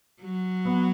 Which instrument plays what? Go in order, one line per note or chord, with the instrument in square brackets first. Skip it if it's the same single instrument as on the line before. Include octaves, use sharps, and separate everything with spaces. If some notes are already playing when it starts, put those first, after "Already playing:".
[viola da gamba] F#3
[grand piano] B3